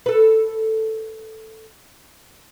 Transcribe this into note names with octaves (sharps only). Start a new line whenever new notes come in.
A4 B4